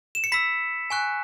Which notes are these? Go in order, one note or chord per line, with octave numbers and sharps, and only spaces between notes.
E7
C#7
B5 E6 B6
G#5 C#6 F#6